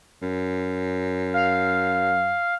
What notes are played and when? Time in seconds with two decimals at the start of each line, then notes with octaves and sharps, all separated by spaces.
0.22 F#2
1.34 F5